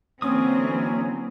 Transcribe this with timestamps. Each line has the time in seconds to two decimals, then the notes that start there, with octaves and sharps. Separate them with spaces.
0.22 D3 E3 F#3 A#3 C4 C#4 D#6